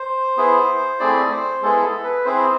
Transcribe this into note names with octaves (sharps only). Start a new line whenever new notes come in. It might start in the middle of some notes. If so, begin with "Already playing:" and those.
Already playing: C5
B3 E4 G#4
A3 C4 E4 G#4 D5
C5
G#3 B3 E4 G#4 A4
A4
B4
C4 E4 G#4 C5